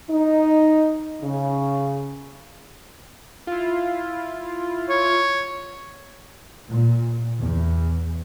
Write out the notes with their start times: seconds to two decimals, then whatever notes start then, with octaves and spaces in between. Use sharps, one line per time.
0.10 D#4
1.22 C#3
3.47 E4 F4
4.89 C#5
6.68 A#2
7.40 E2